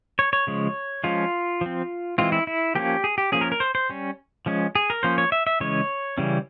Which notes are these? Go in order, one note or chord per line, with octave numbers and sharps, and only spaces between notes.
C#5
C#5
C#3 F3 G#3
F3 G#3 C#4 F4
F3 C4
E3 G#3 C4 F4
E4
E4
F3 A#3 C#4 G4
G#4
G4
F3 A#3 C#4 G#4
A#4
A#4
C5
C5
G3 C#4
F3 G#3 C#4
G#4
A#4
F3 A#3 C#4 C5
C#5
E5
E5
C#3 E3 G#3 C#4 C#5
C#3 E3 G3 C#4